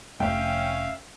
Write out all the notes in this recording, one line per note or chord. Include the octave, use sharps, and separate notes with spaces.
F1 C#2 A3 C#4 E5 F5 G5